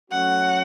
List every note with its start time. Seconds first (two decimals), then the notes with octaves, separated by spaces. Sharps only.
0.11 F#3 A3 C#4 F#4 F#5